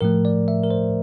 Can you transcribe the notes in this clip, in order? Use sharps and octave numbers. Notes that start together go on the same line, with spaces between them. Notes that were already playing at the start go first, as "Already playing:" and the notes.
A2 F3 A3 A#4
D5
E5
A#4
C5